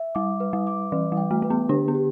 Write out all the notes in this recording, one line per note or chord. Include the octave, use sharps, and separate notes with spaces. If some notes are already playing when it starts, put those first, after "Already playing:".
Already playing: E5
G3 D6
B4
G3
D6
E3 B4
G3
G5
A3
A3 B4
B3
D3 D4 G4
B3
G4